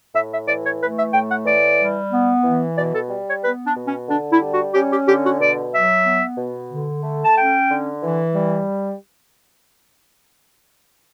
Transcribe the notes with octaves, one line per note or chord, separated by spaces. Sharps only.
A2 E5
E5
E3 D5
C#5
A3 B4
E5
A2 G5
F#5
E3 D5
G3
B3
E3
B2 D5
A4
G3
C#5
B3 B4
D4
B2
C#4
D3 D4
E4
G3
F#4
C#4 G4
G4
D3 G4
F#4
B2 D5
F#3 E5
B3
B2
D3
A3
A5
C#4 G5
D3
E3
G3